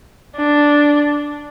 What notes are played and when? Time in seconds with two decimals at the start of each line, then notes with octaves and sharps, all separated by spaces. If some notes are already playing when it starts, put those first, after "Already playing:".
0.36 D4